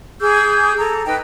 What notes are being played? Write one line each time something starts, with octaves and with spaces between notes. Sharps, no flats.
G#4 D6 E6 G6
A4 A#5
D#4 B4 G5 E6